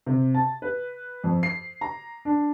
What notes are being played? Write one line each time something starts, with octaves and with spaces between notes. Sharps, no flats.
C3
A5
B4
F2
C7
A#5
D4